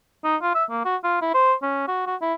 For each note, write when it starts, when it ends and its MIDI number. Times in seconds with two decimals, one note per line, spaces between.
0.24 0.37 63
0.42 0.52 65
0.55 0.65 76
0.71 0.83 58
0.85 0.97 66
1.04 1.21 65
1.22 1.30 64
1.34 1.53 72
1.62 1.86 61
1.88 2.05 66
2.07 2.16 66
2.22 2.34 64